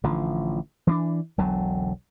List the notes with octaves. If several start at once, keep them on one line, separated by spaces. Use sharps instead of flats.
A1 D3 F3
E3 C4 D4
E1 B1 D3 F#3